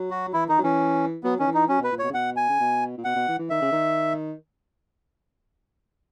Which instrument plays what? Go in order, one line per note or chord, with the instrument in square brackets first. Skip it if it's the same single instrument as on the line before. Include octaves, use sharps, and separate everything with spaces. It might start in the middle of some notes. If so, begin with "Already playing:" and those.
Already playing: [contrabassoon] F#3
[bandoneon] F#4
[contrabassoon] E3 [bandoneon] E4
[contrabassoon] D#3 [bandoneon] D#4
[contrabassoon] F#3
[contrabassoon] E3 [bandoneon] C#4
[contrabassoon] F#3 [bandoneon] B3
[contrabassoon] D#3 [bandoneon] C#4
[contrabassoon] E3
[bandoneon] D#4
[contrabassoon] F#3 [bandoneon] C#4
[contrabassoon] B2 [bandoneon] B4
[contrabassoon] A#2
[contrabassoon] B2 [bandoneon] C#5
[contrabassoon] C#3
[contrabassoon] B2 [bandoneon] F#5
[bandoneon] G#5
[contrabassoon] C#3
B2
A#2
[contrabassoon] B2 [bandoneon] F#5
[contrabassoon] B2
E3
E3
[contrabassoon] D#3 [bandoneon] E5
[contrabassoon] C#3
D#3